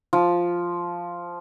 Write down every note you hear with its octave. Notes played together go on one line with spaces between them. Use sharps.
F3